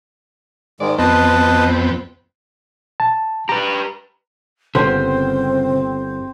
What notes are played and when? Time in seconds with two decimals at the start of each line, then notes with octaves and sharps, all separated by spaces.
0.80 G#2 D#3 G#3 D5
0.98 F2 B3 C4 B4 D#5 A5
3.00 A5
3.49 G4 B4 A#5
4.75 G1 C#3 B3 C4 C5 G5 C6